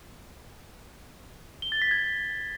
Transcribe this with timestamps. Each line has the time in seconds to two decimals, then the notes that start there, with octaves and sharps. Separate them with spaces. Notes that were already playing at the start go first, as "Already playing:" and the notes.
1.62 G7
1.72 A6
1.82 B6
1.91 G#6